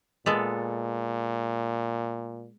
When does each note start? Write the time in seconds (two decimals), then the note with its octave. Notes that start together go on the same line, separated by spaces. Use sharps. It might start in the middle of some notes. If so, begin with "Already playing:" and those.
0.26 A#2 G#3 B3 A4